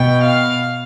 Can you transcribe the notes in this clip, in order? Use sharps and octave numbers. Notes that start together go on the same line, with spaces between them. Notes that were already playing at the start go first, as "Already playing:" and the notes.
Already playing: B2 G5
F5